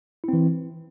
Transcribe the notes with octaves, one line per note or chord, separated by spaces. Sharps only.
E3 C4 E4